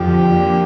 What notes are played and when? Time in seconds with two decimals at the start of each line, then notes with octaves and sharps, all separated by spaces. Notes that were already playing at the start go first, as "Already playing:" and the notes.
Already playing: F2 D3 F3 G4
0.33 F3 A#3 D4